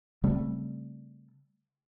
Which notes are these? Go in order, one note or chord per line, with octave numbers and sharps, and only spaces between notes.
C#3 G3 A3 C4